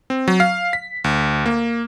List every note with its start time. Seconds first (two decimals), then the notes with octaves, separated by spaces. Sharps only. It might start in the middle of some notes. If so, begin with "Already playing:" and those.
0.10 C4
0.28 F#3
0.40 F5
0.73 B6
1.04 D2
1.46 A#3